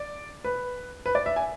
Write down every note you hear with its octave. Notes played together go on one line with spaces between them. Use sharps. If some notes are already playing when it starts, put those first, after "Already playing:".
Already playing: D5
B4
B4
D5
E5
G#5